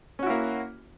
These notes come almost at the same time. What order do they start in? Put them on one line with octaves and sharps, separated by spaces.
C#4 F#4 E4 A#3